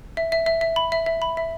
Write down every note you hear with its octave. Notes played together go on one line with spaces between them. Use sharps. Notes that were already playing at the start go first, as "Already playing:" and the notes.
E5
E5
E5
E5
B5
E5
E5
B5
E5